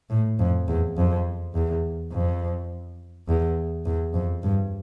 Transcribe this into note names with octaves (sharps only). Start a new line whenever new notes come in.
A2
F2
E2
F2
E2
F2
E2
E2
F2
G2